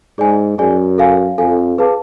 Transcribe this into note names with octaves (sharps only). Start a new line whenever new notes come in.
G#2 G#4 D5 G#5
F#2 G#4 D5 G#5
A4 F5 G#5
F2 A4 F5 G#5
G#4 B4 F5 A5 D6